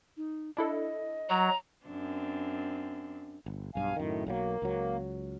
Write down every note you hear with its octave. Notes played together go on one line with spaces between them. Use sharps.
D#4
D4 E4 A4 D#5
F#3 A#5
F#2 C4 D4
G1
B1 G2 F5 G#5
F#2 A2 D#3
B1 D3 F#3 A#3
C#2 F#3